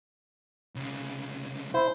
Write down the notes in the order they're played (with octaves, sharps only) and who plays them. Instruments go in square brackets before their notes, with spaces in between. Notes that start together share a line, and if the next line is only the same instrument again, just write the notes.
[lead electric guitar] C2 C#3
[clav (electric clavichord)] E4 [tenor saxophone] C5